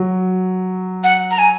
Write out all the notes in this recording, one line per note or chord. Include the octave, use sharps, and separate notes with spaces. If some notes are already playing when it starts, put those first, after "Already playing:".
Already playing: F#3
F#5
A#5
G#5